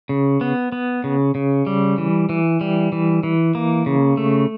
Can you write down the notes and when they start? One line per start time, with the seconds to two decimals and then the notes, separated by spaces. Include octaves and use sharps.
0.09 C#3
0.41 B3
0.72 B3
1.04 C#3
1.35 C#3
1.67 G3
1.98 E3
2.29 E3
2.61 G3
2.92 E3
3.23 E3
3.55 A#3
3.86 C#3
4.17 A3